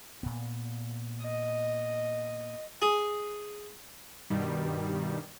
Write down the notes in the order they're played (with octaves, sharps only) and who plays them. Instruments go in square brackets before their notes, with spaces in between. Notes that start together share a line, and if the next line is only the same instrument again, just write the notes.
[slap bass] A#2 B3
[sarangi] D#5
[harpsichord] G#4
[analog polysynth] G2 B2 D#3 G3